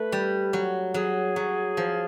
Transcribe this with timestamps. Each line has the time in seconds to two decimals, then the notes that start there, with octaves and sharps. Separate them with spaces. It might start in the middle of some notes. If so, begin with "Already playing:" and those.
Already playing: A3 B4
0.12 G3
0.53 F#3
0.94 F#3 G#4
1.36 F#3
1.77 F3